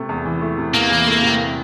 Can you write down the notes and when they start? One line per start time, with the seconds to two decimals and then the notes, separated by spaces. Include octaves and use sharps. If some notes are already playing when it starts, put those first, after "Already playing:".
Already playing: C3 A3
0.09 E2
0.25 E3
0.41 A3
0.58 C3
0.74 E2 A#3
0.90 E3
1.07 A3
1.22 C3